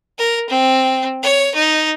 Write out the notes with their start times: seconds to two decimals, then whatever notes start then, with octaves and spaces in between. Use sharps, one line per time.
0.18 A#4
0.49 C4
1.23 C#5
1.55 D#4